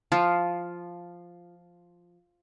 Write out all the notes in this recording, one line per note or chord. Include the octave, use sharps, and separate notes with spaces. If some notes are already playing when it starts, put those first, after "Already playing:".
F3 F4